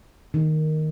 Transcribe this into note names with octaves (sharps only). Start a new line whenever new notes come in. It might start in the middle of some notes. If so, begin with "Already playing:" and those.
D#3